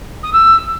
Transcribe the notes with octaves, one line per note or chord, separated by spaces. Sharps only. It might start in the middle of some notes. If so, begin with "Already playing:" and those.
D#6
E6